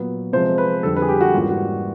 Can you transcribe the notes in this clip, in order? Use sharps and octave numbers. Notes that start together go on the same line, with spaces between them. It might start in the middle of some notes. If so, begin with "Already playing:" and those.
Already playing: A#2 F#3 B3
C3 F3 G#3 C5
B4
F2 D3 G3 A4
B4
G#4
G4
F#4
G#2 E3 G3 A#3 C#4 F4
F#4